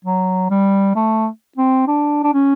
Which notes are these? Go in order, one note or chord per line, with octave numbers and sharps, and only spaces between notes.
F#3
G3
A3
C4
D4
D4
C#4